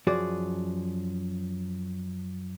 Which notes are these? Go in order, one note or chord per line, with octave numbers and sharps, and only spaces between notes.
F#2 F3 F#4 G#4 D5